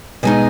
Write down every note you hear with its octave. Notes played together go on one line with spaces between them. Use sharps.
B2 G#3 D#4 D#5 G#5